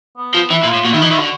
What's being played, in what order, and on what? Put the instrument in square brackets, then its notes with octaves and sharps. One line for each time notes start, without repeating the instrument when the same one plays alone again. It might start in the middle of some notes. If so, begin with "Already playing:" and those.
[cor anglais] B3
[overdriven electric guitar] F3
[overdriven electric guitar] E3 [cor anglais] E4
[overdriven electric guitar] A#2
[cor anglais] F4
[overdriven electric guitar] A2
[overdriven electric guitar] A#2 [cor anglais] F#4
[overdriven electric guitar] D#3 [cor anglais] E4
[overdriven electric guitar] E3 [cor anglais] D#4
[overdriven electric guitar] D#3 [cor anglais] E4
[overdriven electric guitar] D3 [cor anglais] F#4